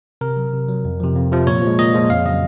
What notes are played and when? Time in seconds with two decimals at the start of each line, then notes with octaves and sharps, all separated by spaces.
0.21 C3 A#4
0.37 F#3
0.53 C3
0.68 F#3
0.85 F2
1.00 C3 F3
1.16 F2
1.32 C3 F3
1.47 A#2 C#5
1.62 F3 G#3
1.79 A#2 D#5
1.94 F3 G#3
2.10 F2 F5
2.26 C#3 F#3 D#5